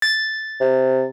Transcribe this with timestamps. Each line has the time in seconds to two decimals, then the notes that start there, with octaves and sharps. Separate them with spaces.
0.02 A6
0.60 C3